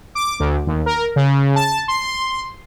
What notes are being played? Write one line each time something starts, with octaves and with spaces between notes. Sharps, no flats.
D6
D2
D#2
A#4
C#3
A5
C6